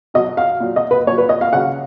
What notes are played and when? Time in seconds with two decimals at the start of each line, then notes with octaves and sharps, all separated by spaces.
0.14 B2 F#3 D#5
0.37 F5
0.60 A#2 F#3
0.76 D#5
0.91 B4
1.06 A#2 C#5
1.11 F#3
1.18 B4
1.29 D#5
1.41 F5
1.53 C#3 F#3 F#5